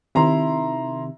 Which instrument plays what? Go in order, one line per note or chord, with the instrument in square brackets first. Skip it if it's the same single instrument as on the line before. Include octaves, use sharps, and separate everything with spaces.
[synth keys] C3 D#3 [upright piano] E4 A#5 C6